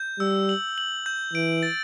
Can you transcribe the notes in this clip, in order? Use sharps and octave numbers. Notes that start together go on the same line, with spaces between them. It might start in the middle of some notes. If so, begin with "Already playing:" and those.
Already playing: G6
G3 E6
F#7
F#7
G6
E3 D7
A6